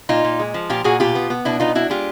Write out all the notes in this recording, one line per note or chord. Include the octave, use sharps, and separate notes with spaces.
A#2 D#4 F4
A#2
G#3
F3
A#2 F4 G4
A#2 F#4 G#4
B2 F4 G4
B3
B3
B2 D4 E4
B3 D#4 F4
D4 E4 F#4
G#3 F4 G4